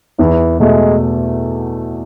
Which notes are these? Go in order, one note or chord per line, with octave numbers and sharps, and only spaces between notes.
E2 E3
B2 G#3 A3